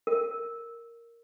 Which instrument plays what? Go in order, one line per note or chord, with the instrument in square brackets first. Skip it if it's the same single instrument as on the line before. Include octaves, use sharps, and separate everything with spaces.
[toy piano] A#4